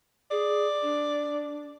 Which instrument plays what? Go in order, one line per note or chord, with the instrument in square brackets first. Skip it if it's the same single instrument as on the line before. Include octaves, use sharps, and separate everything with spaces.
[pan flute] G#4 [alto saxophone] D5
[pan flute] D4